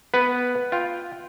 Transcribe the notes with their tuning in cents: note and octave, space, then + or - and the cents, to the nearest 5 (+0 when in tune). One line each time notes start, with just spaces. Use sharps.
B3 +0 B4 +0
F4 +0 G5 +0